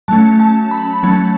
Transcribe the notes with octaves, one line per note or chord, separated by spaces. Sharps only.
F#3 A3 C#4 A5
A5
B5
F#3 A3 C#4 A5